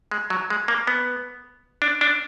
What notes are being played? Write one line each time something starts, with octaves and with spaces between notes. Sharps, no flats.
G#3
F#3
G#3
A#3
B3
D4
D4